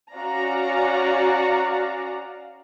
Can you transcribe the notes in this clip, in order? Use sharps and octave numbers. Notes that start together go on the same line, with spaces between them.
C#4 F#4 D5 F5 A#5